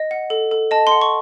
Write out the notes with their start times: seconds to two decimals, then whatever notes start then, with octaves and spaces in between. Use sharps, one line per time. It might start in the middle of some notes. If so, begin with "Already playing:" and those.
Already playing: D#5
0.11 F#5
0.30 A4
0.51 A4
0.71 D#5 A5
0.87 F#5 C6
1.01 C#6